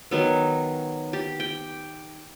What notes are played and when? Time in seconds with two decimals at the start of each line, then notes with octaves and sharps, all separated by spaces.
0.11 D#3 F#3 B3
1.13 G4
1.40 G5